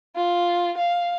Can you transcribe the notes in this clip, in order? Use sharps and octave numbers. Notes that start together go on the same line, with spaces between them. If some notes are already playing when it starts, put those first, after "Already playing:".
F4
F5